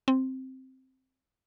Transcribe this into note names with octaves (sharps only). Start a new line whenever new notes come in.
C4